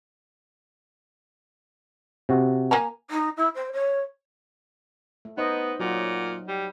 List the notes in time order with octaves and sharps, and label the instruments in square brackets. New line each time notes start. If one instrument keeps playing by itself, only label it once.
[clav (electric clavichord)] C3 F#4
[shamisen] A#3 G#5 A#5
[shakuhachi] D#4
E4
C5
C#5
[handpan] A3
[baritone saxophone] B3 [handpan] D#4 C5 D#5
[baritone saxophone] A#2 [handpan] F#3 F#4
[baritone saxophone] G3